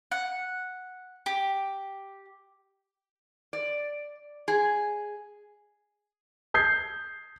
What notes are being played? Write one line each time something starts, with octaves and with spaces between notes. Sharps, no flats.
F#5
G4
D5
G#4
D#6 G6 G#6 C7